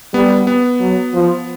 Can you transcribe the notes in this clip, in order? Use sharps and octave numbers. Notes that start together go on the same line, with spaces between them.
G3 B3
B3
F#3
F3